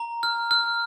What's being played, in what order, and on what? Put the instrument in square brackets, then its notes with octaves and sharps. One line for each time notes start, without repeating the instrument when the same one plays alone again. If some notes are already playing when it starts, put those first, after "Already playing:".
Already playing: [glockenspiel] A#5
F6
F6